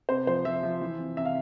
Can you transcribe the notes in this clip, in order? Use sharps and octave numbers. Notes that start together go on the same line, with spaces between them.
C3 C5
F3 C5
F3 E5
F3
E3
C3
C3 E5
F5